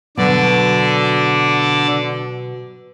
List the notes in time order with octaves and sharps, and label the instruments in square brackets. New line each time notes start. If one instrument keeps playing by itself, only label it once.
[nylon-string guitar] B2 F#3 [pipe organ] D3 D5